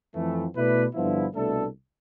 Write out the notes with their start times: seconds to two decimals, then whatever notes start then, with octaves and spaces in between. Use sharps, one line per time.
0.14 F2 E3 A3
0.54 B2 A3 E4 B4 D5
0.94 G2 D3 F3 B3 E4
1.33 C2 B2 A3 D4 A4